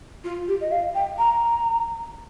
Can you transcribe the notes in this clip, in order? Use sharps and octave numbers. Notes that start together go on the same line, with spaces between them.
F4
G4
D#5
F5
G5
A#5